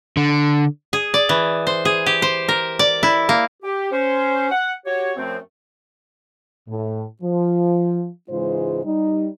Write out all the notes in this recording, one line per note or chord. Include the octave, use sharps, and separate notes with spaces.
D3
G#4
D5
E3
C5
G#4
G4
C5
A#4
D5
E4
A#3
G4
C#4 C5
F#5
F#4 G4 C#5
F#2 F3 A3 C4
A2
F3
G#2 C#3 E3 G#3 F4 C5
G3 D#4